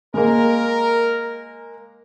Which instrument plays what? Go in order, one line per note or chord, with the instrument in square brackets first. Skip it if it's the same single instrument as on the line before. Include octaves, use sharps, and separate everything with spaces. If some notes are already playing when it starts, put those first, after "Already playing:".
[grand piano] G#3 A#3 [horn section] A#4